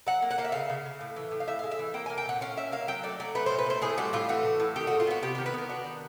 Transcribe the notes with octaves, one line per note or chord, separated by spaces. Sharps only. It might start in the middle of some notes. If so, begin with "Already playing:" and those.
F#3 F#5
A#3
F#5
A#3 F5
E5
C#3 F5
C#3
C#3
A2
E3
A2
F5
A2 E5
F5
G#3
E5
E3
A#3 G5
G#5
A#3
G5
A#2 F#5
C#4 F5
A#2 E5
A#3 F5
F#3 G5
A3 D5
F#3 D5
A3 B4
C5
A#2
B4
A3 C5
A2 G#4
G3 F#4
A2 F4
E3 F#4
A2
A2
D#3 G4
F#4
G#3
F4
B3 F#4
C3 G4
G4
D#3
B4
B3 A#4
D4 F#4
D#3